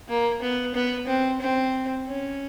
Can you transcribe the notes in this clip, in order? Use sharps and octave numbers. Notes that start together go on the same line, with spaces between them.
A#3
B3
B3
C4
C4
C#4